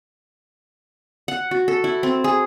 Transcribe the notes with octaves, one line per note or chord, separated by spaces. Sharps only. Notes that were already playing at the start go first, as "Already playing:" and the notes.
F#5
F#4
A4
E4
C4
G#4